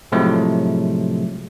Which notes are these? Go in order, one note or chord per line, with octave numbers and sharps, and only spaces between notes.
A2 C3 F3 F#3 G#3 A3